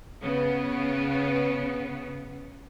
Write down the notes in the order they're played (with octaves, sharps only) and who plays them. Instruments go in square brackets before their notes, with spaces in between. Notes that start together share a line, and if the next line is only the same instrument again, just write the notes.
[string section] C#3 B3